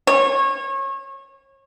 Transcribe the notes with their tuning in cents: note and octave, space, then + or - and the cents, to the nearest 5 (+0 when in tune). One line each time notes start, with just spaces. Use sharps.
C#5 -30